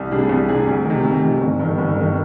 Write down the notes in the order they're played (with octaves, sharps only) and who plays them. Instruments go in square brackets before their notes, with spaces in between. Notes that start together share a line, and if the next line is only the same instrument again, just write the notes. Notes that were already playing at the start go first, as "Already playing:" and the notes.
Already playing: [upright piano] C2
C3 G3 D4 G#4
C2
C3 G3 D4 G#4
D2
C3 D#3
D2
C3 D#3
G1
G2 D#3
G1
G2 D#3